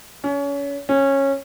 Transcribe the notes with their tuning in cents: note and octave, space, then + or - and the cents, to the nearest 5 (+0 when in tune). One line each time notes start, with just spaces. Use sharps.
C#4 +30
C#4 -15